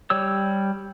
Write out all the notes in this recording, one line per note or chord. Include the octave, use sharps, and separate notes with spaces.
G3 C#5 E6